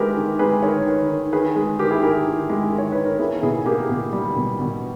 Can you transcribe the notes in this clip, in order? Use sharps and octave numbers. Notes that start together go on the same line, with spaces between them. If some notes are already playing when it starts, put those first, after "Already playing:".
Already playing: D#3 G#3 E4 G4 A#4 B4
D#3
G#3 G#4 B4
D#3 A#4 C#5
D#3
D#3
D#3 G#4 B4
G#3
D#3 G4 A#4
E4 G#4
D#3 G4 A#4
D#3
G#3
D#3
C#5
D#3 B4
A#4
A#3 E4 G#4
B2 E4 G#4
A#3 G4 A#4
B2
G3
B2
B2